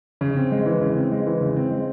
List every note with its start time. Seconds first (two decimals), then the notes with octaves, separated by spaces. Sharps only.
0.21 C#3
0.36 C4
0.51 G#3
0.66 E3
0.81 C#3
0.96 C4
1.11 G#3
1.26 E3
1.41 C#3
1.56 C4
1.71 G#3